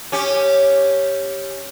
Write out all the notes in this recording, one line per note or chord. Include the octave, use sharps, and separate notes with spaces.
C#4 G4